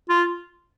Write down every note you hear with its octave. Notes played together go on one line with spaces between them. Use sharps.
F4